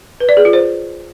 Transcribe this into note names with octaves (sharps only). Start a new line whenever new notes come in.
B4
D5
G#4
F4
C5